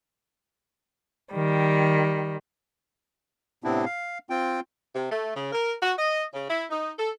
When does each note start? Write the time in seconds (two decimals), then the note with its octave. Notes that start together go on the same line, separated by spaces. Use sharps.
1.34 D#3 G3
3.64 A2 C3 B3 C4 D4 E4
3.85 F5
4.30 C4 F4 G5
4.94 C3
5.11 A3
5.35 C#3
5.53 A#4
5.82 F#4
5.98 D#5
6.34 C#3
6.49 E4
6.70 D#4
6.98 A4